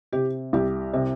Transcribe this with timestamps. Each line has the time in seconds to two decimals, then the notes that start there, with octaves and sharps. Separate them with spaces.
0.13 C3 G4
0.53 C2 G4
0.93 C3